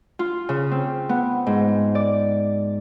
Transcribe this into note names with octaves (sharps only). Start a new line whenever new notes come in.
F4
C#3
C4
B3
G#2
D5